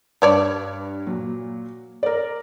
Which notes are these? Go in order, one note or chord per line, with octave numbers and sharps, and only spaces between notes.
G2 G3 C#5 D5
A#2 F#3
A#4 D5